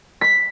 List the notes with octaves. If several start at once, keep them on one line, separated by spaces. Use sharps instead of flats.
B6